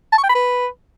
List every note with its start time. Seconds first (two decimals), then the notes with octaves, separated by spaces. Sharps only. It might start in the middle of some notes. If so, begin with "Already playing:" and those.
0.12 A5
0.18 C#6
0.24 G5
0.29 B5
0.35 B4